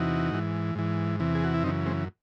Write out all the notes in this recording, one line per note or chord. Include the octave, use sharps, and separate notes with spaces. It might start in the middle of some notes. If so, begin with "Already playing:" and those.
Already playing: E2 C3 E3 D#4 F#4
G#2 E3
G#2 E3
E2 C3 E3
G#4
F#4
E4
F#2 C#3 E3 C4 D#4
G#3 C4